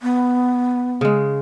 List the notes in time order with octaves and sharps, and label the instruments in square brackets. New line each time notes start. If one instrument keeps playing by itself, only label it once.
[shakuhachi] B3
[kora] C#3 G#3